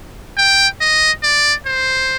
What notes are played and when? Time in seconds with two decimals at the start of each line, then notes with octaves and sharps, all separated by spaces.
0.38 G5
0.81 D#5
1.23 D5
1.67 C5